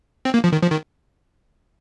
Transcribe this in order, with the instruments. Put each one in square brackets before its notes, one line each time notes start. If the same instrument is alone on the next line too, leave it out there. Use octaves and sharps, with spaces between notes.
[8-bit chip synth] C4
A#3
F3
D#3
F3
D#3